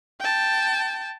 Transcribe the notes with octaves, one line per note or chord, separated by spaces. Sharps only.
G5 A5